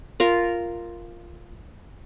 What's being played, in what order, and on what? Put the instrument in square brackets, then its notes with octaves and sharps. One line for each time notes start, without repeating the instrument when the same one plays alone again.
[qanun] F4 A#4 F5